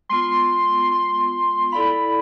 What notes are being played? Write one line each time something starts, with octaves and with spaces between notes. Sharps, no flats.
G#3 B3 F4 C6
C6
E4 A4 D5 F5 B5